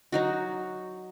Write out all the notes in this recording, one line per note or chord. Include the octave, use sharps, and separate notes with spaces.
F#3 D#4 F#4